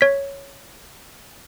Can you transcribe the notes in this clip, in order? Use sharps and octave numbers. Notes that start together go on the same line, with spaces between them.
C#5 B6